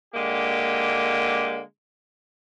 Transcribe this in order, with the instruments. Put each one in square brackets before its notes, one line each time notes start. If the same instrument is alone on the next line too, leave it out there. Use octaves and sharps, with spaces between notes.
[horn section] D3 G#3 A#3 G4